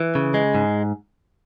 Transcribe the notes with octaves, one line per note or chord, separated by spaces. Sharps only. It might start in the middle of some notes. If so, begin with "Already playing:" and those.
Already playing: E3
C#3
G#3
G#2